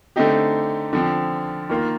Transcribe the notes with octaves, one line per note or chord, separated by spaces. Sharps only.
D3 A3 C4 D#4 G4
D3 F3 C4
D#3 A#3 F4